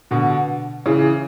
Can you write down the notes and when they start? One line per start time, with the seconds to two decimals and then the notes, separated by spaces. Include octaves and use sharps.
0.11 B2 D3
0.86 C#3 E3